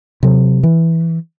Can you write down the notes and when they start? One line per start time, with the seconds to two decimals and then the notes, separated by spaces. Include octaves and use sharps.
0.23 C3 F#3
0.63 E3